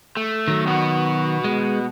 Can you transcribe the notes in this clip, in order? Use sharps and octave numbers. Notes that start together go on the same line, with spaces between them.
A3
D#3 F#3
B2 B3 F#4
G#3